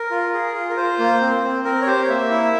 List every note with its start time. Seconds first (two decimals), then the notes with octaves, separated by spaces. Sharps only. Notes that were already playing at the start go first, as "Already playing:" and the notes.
Already playing: A#4
0.11 F4
0.33 G#4
0.55 F4
0.70 A#4
0.77 F4 C5
0.99 A#3
1.21 C4
1.43 C4
1.64 C4 A#4
1.81 C#5
1.87 G4 C5
2.04 C#5
2.08 A#3 E5
2.30 E4